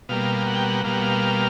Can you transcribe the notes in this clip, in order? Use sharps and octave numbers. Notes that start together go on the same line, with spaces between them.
B2 G3 A#3 F5
F#5
G5
F#5
B2 G3 A#3 F5
F#5
F5